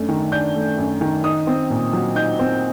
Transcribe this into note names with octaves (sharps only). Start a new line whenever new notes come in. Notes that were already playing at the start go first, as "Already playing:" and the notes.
Already playing: F#2 A3 D4
D#3
D4 G6
A3
F#2
D#3
D#4 D#6
C4
A#2
F#3
D#4 G6
C4